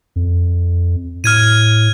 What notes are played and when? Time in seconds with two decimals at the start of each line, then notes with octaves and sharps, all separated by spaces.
0.16 F2
1.24 A2 F6 G#6 D#7